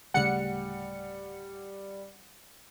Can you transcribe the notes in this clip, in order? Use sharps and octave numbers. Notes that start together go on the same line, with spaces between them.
D1 C#3 G3 A3 F#5 C#7